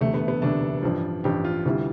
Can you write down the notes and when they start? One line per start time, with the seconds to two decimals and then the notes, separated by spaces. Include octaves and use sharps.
0.01 E1 D2 C3 A3
0.14 B3
0.28 B3
0.42 E1 D2 C3 D4
0.82 A1 G2 F3
1.24 A1 G2 F3 G4
1.45 F4
1.66 D2 C3 E3 G3